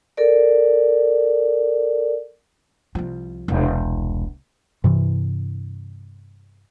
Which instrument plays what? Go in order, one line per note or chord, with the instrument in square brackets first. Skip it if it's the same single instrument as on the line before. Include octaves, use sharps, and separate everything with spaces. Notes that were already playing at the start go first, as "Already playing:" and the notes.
[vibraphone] A4 A#4 D5
[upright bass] C2 F3
E1 C2
[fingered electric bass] G2 C3 E3